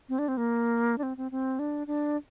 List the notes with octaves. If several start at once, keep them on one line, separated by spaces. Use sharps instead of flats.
C4
D4
C4
A#3
D4
C4
C4
C4
D4
D4